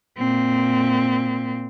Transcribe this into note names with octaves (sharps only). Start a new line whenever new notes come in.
A#2 C4